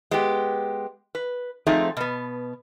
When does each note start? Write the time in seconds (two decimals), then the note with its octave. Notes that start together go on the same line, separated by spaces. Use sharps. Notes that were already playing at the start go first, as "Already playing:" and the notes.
0.11 G#3 B3 G4
1.15 B4
1.67 F3 A3 C4 D#4 G#4
1.97 B2 B3